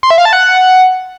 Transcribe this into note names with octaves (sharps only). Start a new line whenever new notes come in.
C6
E5
F5
A5
F#5